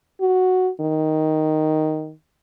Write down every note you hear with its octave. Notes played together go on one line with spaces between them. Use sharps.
F#4
D#3